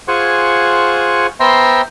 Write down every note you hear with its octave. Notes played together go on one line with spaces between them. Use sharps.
F4 G#4 C5 F#5 G#5 C#6
B3 C5 E5 G5 A#5 C6